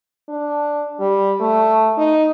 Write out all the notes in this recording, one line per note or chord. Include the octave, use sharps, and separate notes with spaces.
D4
G3
A3
D#4